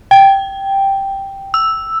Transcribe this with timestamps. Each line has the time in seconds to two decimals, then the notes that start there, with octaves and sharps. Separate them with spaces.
0.11 G5
1.54 E6